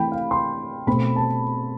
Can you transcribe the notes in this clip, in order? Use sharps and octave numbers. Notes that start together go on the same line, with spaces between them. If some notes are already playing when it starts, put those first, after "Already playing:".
Already playing: E3 A3 C4 G5 B5
F5
C6
B2 A3 C4 B5
A5